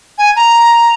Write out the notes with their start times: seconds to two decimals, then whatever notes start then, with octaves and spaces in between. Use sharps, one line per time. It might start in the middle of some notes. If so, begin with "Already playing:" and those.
0.18 G#5
0.36 A#5